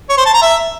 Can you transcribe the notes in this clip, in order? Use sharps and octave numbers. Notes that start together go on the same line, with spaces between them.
C#5
C5
A5
A#5
E5